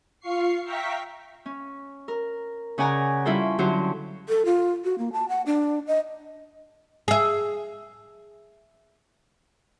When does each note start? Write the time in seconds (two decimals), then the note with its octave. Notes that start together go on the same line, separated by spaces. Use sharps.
0.20 F4 F5 C#6 C7
0.63 E5 F5 G5 A#5 C#6 B6
1.46 C#4
2.08 A#4
2.78 C#3 C#4 D5 F#5 G#5 A#5
3.25 G3 C#4 E4 F4 A4 C5
3.59 D3 F#3 C#4 F#4 G4 C5
4.29 A4
4.45 F4
4.84 F#4
4.98 A#3
5.13 A5
5.29 F#5
5.46 D4
5.87 D#5
7.08 G#4 E5